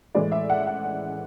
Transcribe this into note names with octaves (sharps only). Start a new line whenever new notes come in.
A2 E3 G#3 D5
E5
F#5
F#5